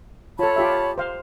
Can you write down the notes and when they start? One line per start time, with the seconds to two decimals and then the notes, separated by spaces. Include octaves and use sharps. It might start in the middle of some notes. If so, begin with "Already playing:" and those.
0.39 F4 A4 C#5 A5 B5
0.56 F4 G4 E5
0.98 C5 F5